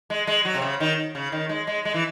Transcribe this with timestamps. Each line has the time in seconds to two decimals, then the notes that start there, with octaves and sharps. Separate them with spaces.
0.10 G#3
0.27 G#3
0.45 F#3
0.55 C3
0.62 C#3
0.80 D#3
1.15 C#3
1.32 D#3
1.49 G#3
1.67 G#3
1.85 G#3
1.94 E3